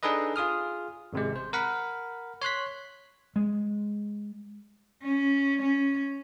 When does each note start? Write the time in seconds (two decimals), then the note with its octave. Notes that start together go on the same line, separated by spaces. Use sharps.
0.03 D4 D#4 G#4 A4 B4 D#5
0.36 F4 G#4 D#6 F6
1.13 G#1 C3 G#3
1.36 C5
1.53 A#4 F#5 B5
2.42 C#5 C6 F#6 B6
3.36 G#3
5.03 C#4
5.62 C#4